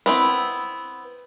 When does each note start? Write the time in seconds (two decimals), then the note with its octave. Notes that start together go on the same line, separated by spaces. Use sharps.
0.06 B3 C4 E4